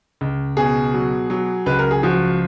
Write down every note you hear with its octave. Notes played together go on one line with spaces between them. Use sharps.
C#2
B2 G#4
F#3
F#3
C#2 B4
A#4
G#4
F3 F#4